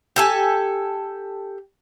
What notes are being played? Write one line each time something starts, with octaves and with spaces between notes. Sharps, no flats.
G4 A4 G#5